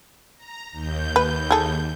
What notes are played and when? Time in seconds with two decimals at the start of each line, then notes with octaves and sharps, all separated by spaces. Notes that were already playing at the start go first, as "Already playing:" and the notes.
0.38 A#5
0.72 D#2 G6
1.16 B4
1.51 G#4 A4